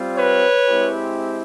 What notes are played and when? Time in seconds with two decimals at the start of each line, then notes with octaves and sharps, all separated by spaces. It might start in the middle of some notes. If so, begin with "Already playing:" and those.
Already playing: G3 C4 F4
0.17 B4 C#5
0.68 G#3 C4 E4 G4